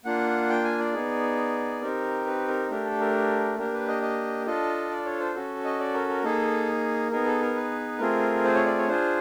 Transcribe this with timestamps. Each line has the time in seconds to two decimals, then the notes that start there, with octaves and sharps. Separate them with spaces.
0.05 A#3 D4 F4 F#5
0.49 G5
0.64 G#5
0.79 D5
0.93 B3 D#4 G#4
1.82 C4 D#4 G4 A#4
2.26 B4
2.48 A#4
2.70 A3 D4 G4 A#4
2.85 A4
3.00 A#4
3.58 A#3 D4 G4 A#4
3.73 B4
3.88 D#5
4.02 D#5
4.46 D4 F4 A4 D#5
4.91 D5
5.05 C#5
5.20 C5
5.35 C#4 F#4 A4
5.64 D#5
5.79 D5
5.94 A#4
6.09 A#4
6.23 A#3 D#4 G#4 A4
7.11 B3 D#4 G#4 A#4
7.26 A4
7.41 A#4
7.56 B4
7.99 A3 C4 F4 G#4 A#4
8.44 C5
8.55 C#5
8.66 D5
8.77 C#5
8.88 D4 F4 G#4 C5